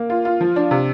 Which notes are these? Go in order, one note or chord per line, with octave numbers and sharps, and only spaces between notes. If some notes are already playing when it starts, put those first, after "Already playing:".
Already playing: A#3
F4
F4
F3
D4
C3